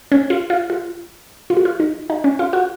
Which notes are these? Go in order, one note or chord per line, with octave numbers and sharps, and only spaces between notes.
C#4
F4
F4
F4
F4
F#4
F4
D#4
D#4
C#4
F4
F#4